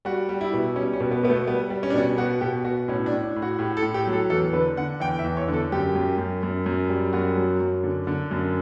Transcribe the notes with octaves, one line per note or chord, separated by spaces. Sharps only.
G3 F#4
G3
E4
B2
G3 C#4
C#4
B2
B3
B2 B3
A3
G3 B3
G3
C#4
D4
B2 C#4
B2 F#4
B2 G4
B2 F#4
A2 C#4
D4
A2
D4
A2
F#4
A2 G4
A4
A2
G4
F#3
A4
E2 A4
D3 B4
D3 F#5
E2 G5
E5
E2
C#5
D3
A4
F#2 G4
F#2
F#2
F#2
F#2
G3
F#2 F#4
F#3
F#2
D3
D3
F#2